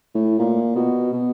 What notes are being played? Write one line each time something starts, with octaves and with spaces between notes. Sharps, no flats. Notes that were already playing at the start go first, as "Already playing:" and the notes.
A2
A#2
B2
B2